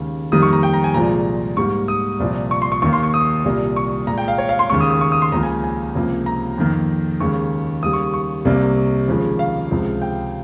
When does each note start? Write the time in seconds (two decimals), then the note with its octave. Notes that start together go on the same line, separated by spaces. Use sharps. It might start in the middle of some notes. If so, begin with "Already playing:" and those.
Already playing: D#2 C#3 G#3
0.32 F2 D#3 G3 A#3 D#6
0.42 C#6
0.53 A#5
0.63 G5
0.74 A#5
0.84 G#5
0.94 C2 A#2 F3 G#3 A#5
1.57 G#2 G3 A#3 C#6
1.88 D#6
2.20 C2 A#2 F3
2.51 C#6
2.62 C6
2.72 C#6
2.82 D#2 D#3 A#3 C#6
2.93 C6
3.03 C#6
3.14 D#6
3.45 C2 A#2 G3 A#3
3.76 C#6
4.07 A#2 G#3 A#5
4.18 G5
4.28 F5
4.38 C#5
4.49 F5
4.59 C6
4.70 D#2 C#3 G#3 C#6
4.81 D#6
4.91 D#6
5.01 C#6
5.12 D#6
5.22 C6
5.32 C#2 C#3 F3 A#3 A#5
5.43 G#5
5.64 G#5
5.95 C#2 C3 F3 A#3
6.26 A#5
6.58 F2 D#3 A#3
7.20 D#2 C#3 G#3 C#6
7.83 D#2 C#3 G3 D#6
7.93 C#6
8.14 C#6
8.45 C2 C3 G3 A#3
9.08 D#2 C#3 F3 G#3
9.39 F5
9.70 C#2 C3 F3 G#3
10.02 G5